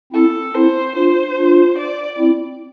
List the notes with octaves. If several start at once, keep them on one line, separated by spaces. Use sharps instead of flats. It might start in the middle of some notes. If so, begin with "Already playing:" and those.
C4 E4 A4
C4 E4 C5
D4 F4 C5
D4 F4
D5
C4 E4